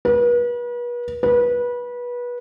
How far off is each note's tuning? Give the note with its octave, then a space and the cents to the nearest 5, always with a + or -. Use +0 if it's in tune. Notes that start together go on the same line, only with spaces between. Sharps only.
B4 -40
B4 -25